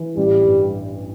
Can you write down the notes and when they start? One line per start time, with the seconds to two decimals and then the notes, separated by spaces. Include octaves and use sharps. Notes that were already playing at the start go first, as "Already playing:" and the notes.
Already playing: E3
0.17 A1 G3
0.45 G2